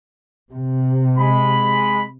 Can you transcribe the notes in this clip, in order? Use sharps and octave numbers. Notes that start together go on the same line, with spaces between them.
C3
G#3 B5